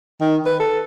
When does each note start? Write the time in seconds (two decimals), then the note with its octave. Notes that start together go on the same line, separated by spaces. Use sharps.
0.21 D#3
0.46 B4
0.60 A4